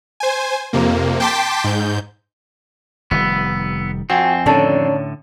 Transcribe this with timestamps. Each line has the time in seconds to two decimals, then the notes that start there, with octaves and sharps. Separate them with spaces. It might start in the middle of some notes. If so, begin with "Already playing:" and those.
0.20 C5 G#5
0.73 F2 C3 A#3
1.20 G5 A5 C6 D6 B6
1.64 G#2 G6
3.11 F1 D#3 G3 B3 E6
4.10 F2 C4 F#4 G5 G#5
4.46 A2 D3 D#3 C#4 D4 A4 C#5